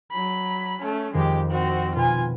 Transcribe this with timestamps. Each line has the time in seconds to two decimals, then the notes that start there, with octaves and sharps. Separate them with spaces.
0.13 F#3 B5
0.81 A3 C#4
1.13 F2 D#3 G#3 G4 C7
1.50 C4 F#4
1.95 B2 C4 F4 B4 G#5